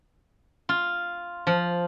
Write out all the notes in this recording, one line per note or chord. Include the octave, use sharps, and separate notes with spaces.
F4
F3